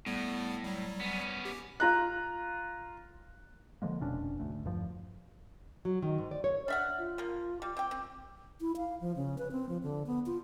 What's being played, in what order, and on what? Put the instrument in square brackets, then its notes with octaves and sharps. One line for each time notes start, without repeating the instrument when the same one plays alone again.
[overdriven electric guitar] A2 [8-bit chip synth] G3 B3
[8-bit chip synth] F#3 G3
[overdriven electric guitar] B3 C#4
[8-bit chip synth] G4
[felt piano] F4 A#5 F#6
[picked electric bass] D3 F3 G#3 A#3
F1 B2 C#4 D4
G#1 D2 A3
E2 G2 F3
[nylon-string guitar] F#3
D#3
G#2
D5
C#5
[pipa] D4 E5 F#5 [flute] F6
[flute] F4
[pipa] F3 A#3
[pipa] G3 [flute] D6
[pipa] C4 G5
C4
[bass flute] E4
F5
F3
C#3
B4
C4
F3
D3
B3
F4